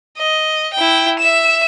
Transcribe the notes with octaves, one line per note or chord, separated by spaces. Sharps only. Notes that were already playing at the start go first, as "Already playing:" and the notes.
D#5
E4 G5
E5 E7